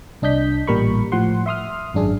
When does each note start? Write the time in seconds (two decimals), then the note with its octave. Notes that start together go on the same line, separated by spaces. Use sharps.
0.22 C2 D4 D#5 G6 B6
0.67 A1 A#2 G3 A#4 B5 C#6
1.12 A2 F3 F#5 C6
1.46 E5 C6 D#6 F6
1.94 G#1 F#2 D4 G#4